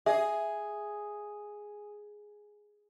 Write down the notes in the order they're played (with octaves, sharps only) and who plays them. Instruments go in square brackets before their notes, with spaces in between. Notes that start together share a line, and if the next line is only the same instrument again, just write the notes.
[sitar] G#4 [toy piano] E5